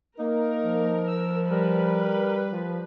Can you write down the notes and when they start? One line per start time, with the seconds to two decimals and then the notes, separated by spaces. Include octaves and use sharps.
0.19 A#3 D#4 A#4
0.64 F3
1.07 E6
1.50 G3 A#4 B4
2.52 F3